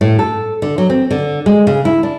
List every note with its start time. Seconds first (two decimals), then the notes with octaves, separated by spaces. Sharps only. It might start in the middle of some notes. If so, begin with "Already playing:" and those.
0.01 A2
0.19 A4
0.62 D3
0.78 F#3
0.90 C4
1.11 D3
1.46 G#3
1.67 C#3
1.85 E4
2.03 D4